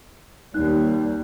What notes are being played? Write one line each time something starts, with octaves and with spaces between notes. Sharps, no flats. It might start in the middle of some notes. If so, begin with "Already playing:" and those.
D#2 G3 D#4 F#6